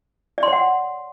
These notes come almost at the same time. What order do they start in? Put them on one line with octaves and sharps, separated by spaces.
D5 C6 C#5 F#5